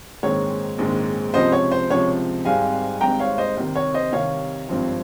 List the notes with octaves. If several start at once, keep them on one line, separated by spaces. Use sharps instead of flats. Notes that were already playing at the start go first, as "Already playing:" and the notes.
A#1 G#2 D#3 G#3 C4 C#5
A#1 G#2 D#3 G#3 C4
C#2 C3 F3 C5 D#5
C#5
C5
C#2 C3 F3 C#5
G#1 G#2 G3 C4 F5 G#5
G#1 G#2 G3 C4 G5 A#5
C#5 F5
C5 D#5
C2 C3 D#3 C5
C#5
C5 D#5
C2 C3 D#3 C#5 F5
G#1 G2 F3 C4